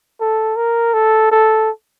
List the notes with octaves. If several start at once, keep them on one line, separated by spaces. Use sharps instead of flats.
A4
A#4
A4
A4